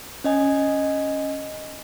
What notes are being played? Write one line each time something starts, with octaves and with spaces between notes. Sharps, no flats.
C#4 D#5 G#5